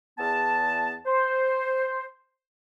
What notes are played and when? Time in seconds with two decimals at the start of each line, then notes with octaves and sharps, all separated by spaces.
0.18 E2 B3 A5
1.06 C5